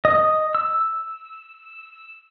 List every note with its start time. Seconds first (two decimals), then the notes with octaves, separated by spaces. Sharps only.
0.05 D#5
0.55 E6